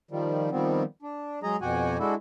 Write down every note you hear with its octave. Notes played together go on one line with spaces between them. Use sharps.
D#3 F3 G3
D#3 F3 G3 B3 C4
D4
F#3 G#3 G#4 D#5 A#5
F2 B2 F#4 G4 F#5 G#5
G#3 D4 E4 F#4 A4